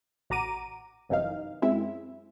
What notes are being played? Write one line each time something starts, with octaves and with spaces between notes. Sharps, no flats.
A1 F#4 A#5 D6 D#7
G1 F#2 C3 E3 D#4 F5
F#2 G#3 C4 E4 E5